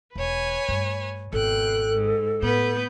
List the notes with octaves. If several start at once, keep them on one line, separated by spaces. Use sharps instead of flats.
E1 B4 C#5 G#5
G2 A3
G#1 B2 A4 G5 F#6
G#2
A2 B3 B4 G6